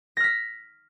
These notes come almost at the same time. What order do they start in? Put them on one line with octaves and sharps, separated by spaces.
A#6 F6 B6